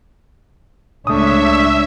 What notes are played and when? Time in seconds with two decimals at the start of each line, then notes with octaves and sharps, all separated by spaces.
1.07 C#2 A3 D4 C#5 E5 D#6